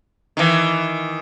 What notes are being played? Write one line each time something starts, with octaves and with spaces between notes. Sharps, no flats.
D#3 E3